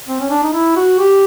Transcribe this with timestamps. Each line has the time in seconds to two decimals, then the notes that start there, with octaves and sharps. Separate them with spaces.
0.08 C4
0.20 C#4
0.30 D4
0.43 D#4
0.53 E4
0.76 F#4
0.99 G4